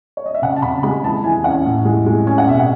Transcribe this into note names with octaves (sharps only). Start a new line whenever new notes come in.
C#5
D#5
E5
C#3 F#5
A5
C#3 B5
G#3 B5
E3 A5
E3 G#5
C#4 F#5
A2
G#3
G#3
C#4 G#5
F#5
B2 E5
F#5